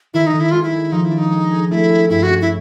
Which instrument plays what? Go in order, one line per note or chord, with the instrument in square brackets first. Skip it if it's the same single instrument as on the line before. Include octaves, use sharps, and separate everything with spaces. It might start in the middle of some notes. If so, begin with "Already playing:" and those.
[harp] D#3 [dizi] E4
[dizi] D#4
[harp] D#3
[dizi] E4
[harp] G#3 [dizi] F4
[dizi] E4
[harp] G#3
[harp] F3 [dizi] D#4
[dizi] E4
[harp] D4
[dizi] D#4
[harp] G#3
G#4
[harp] A3 [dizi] E4
[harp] G#4
[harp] G2 [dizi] E4
[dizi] F#4
[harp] C#4
[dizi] E4